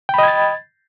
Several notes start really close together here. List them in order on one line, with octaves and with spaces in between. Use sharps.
G5 B5 D#5 G#6 A6